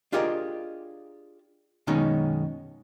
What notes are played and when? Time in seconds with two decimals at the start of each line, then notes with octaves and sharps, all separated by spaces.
0.12 D4 F4 G4 G#4 A#4 D#5
1.87 F#2 B2 D#3 G#3 C#4 D#4